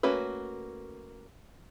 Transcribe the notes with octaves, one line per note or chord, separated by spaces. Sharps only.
A3 A#3 C#4 F#4 B4